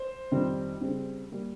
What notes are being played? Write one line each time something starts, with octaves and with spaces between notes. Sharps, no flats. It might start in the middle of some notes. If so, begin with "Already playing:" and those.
Already playing: C5
F2 D#3 G3 C4
C#3 G3 C4
G3 A#3